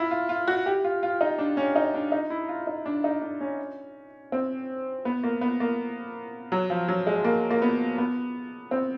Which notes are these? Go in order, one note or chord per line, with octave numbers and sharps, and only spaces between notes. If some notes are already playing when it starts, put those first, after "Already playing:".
Already playing: E4 F4
F4
F4
F#4
G4
F4
F4
D#4
D4
C#4
D#4
D4
D#4
E4
F4
D#4
D4
D#4
D4
C#4
C4
B3
A#3
B3
A#3
F#3
F3
F#3
G#3
A#3
A#3
B3
B3
C4